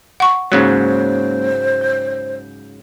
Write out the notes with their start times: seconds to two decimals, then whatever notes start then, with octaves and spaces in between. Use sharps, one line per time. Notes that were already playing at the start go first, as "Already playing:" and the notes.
0.20 F#5 C#6
0.52 G#2 C#3 F#3 G#3 A#3 C#4 C5
1.81 G6